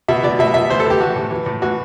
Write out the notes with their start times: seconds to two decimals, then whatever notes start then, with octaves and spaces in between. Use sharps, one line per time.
0.08 B2 E5
0.23 B2 D5
0.39 B2 E5
0.54 B2 E5
0.70 E3 C5
0.80 A4
0.86 E3 G4
1.00 E3 F#4
1.16 A2
1.31 E3
1.46 A2
1.62 E3 F#4